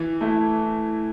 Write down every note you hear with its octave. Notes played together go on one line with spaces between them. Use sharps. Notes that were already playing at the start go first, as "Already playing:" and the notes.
Already playing: E3
A3 E4